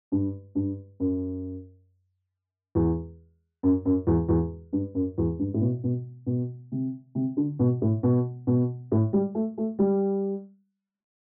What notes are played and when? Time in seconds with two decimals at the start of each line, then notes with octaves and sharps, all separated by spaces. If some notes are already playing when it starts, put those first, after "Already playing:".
0.12 G2
0.55 G2
1.00 F#2
2.75 E2
3.63 F#2
3.85 F#2
4.07 E2
4.29 E2
4.73 G2
4.95 F#2
5.18 E2
5.39 G2
5.54 A2
5.61 B2
5.84 B2
6.27 B2
6.72 C3
7.15 C3
7.37 D3
7.59 B2
7.82 A2
8.03 B2
8.47 B2
8.92 A2
9.13 G3
9.35 A3
9.58 A3
9.79 G3